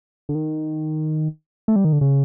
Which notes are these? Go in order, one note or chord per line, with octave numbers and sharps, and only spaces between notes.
D3
D#3
A3
G3
D#3
D3
C#3